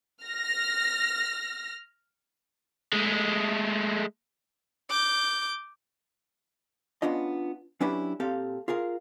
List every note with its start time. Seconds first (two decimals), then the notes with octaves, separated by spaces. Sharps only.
0.23 F6 A#6
2.93 G#3 A3
4.90 D6 G6
7.02 B3 C#4 D4 F4 D#5
7.81 F#3 C#4 D4 E4 G4 B4
8.20 A#2 C4 G4 A4 F5
8.68 F4 G#4 A#4 F5